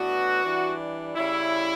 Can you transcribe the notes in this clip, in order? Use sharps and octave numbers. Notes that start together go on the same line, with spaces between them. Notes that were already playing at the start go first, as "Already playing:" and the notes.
Already playing: A2 E3 B3 D4 F#4
E3 G3 D4
C#3 G3 C#4 E4